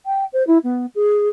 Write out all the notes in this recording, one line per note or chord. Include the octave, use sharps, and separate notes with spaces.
G5
C5
E4
B3
G#4